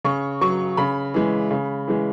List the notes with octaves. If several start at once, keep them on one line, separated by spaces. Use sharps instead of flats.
C#3 C#6
F#3 C#6
C#3 B5
E3 G#3
C#3
E3 G#3